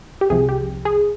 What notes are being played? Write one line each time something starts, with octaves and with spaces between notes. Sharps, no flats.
G4
C2 C3 F3 G#4
G4
G#4